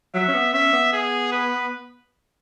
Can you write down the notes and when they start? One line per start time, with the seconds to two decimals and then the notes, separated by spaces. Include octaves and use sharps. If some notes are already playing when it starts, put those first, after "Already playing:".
0.14 F#3 E5
0.28 C#4
0.34 B3
0.53 C#4 E5
0.73 B3
0.93 G#4
1.32 B4